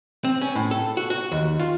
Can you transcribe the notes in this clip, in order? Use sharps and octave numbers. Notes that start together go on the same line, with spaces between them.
C4
C#4
A2
A4
F#4
F#4
D#2
F4